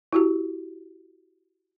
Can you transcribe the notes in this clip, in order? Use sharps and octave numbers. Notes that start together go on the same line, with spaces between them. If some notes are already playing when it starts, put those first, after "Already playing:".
E4 F#4 G4